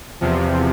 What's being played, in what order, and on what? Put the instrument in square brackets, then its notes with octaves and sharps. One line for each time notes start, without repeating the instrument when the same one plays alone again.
[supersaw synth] E2 C3 F3